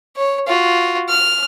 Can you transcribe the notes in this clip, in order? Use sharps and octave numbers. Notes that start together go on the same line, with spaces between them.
C#5
F4 F#4
F6